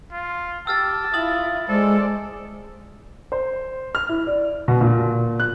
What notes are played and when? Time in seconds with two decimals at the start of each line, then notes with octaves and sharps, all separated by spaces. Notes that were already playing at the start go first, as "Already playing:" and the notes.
0.12 F4
0.67 G4 A5 E6 F6 A6
1.14 E4 F4 D#6 A6 F#7
1.69 G#3 A4 C5 D5
3.32 C5
3.95 F6
4.09 E4
4.27 D5
4.68 B2
4.81 A#2
5.40 F#6